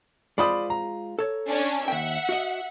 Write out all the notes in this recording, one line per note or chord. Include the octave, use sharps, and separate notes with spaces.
G#3 F4 C5 D5 B5 D#6
A#5
A4 C#5
C#4 D4
D#2 E5 F#5 G5
F#4 D#5